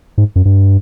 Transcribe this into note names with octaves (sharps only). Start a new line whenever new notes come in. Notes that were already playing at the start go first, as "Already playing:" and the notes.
G#2
F#2
G2